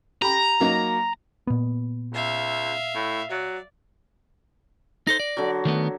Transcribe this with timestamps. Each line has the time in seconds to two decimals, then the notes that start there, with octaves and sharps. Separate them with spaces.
0.22 G4 A#5 B5
0.60 F#3 A#3 D#4
1.47 A#2 B3
2.14 C#2 E5 F5
2.95 A2
3.30 F#3 D5
5.07 D#4 A4 C5 A#6
5.20 D5
5.37 D3 F#3
5.65 D#3 A3 B3